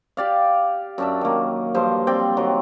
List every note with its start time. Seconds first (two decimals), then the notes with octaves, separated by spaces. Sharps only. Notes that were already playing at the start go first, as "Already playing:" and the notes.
0.17 G4 D5 F5
0.98 F#2 D4 E5
1.21 D#3 A#3
1.74 G2 F3 C5
2.07 C4 D5 G5
2.37 D#3 F#3